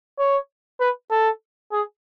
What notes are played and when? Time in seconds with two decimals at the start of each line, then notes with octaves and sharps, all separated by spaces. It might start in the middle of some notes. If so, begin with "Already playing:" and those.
0.19 C#5
0.80 B4
1.11 A4
1.72 G#4